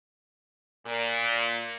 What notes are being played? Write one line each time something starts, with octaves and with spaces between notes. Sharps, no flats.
A#2